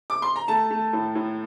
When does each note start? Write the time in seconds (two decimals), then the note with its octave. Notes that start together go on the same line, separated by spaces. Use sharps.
0.10 D6
0.22 C6
0.36 A#5
0.48 A3 A5
0.70 A3
0.93 A2
1.15 A2